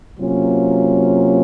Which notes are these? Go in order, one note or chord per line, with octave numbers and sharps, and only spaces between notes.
C3 F#3 A#3 C#4 F4